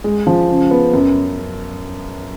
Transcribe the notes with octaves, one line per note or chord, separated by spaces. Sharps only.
G#3
F3
C#3
B3
F#2